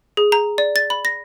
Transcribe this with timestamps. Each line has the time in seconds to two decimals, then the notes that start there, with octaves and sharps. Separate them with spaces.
0.17 G#4
0.32 A#5
0.58 D5
0.76 A6
0.90 B5
1.05 A#6